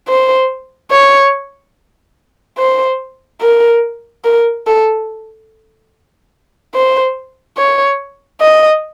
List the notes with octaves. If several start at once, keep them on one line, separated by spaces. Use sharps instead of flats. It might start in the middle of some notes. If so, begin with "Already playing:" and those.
C5
C#5
C5
A#4
A#4
A4
C5
C#5
D#5